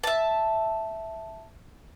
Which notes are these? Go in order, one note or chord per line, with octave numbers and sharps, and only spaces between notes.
E5 A5